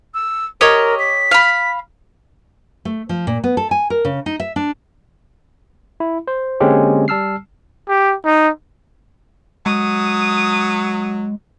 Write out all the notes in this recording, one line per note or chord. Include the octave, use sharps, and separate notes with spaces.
E6
G4 A#4 C#5 D#5
B6
F5 B5
A3
F3
A#2
B3
A4
G#5
A#4
C#3
D#4
E5
D4
E4
C5
D3 G#3 A#3 C4 C#4 G4
G3 A5 E6 F6 C7
G4
D#4
F#3 G#3 D#6